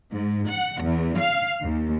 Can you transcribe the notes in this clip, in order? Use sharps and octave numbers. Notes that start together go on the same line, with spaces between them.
G#2
F#5
E2
F5
D#2